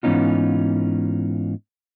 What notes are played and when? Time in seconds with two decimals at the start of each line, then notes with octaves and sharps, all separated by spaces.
0.03 G#2 E3 B3 C#4 D#4 F4